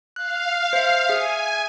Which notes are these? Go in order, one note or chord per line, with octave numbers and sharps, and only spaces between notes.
F5 F#6
C5 E5
G#4 E5 G#5